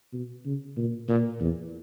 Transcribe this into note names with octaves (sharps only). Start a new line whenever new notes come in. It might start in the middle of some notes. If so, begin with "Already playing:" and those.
B2
C#3
A#2
A#2
E2